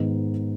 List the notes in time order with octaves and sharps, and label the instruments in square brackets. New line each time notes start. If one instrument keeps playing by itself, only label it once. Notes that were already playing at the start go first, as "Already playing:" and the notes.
Already playing: [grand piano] G#2 D#3 G#3 B3 D#4